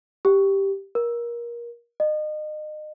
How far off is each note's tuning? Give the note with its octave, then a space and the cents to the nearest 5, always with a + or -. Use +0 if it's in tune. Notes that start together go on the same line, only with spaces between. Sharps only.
G4 +0
A#4 +25
D#5 -30